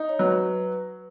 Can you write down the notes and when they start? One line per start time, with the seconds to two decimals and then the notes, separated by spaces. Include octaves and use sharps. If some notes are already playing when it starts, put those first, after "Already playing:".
Already playing: D#4
0.09 C#5
0.19 F#3 B4